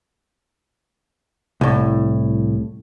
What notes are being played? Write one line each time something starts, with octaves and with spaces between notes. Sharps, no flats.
C2 A2